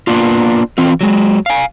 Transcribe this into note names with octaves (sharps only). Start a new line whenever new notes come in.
A#3 B3 D4 F4
E3 C4 F4
F#3 G#3
F5 G#5